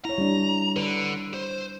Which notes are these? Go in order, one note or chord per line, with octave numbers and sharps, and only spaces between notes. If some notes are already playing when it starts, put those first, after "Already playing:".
E4 C#5 A#5
G3 D4
D3 B4
C5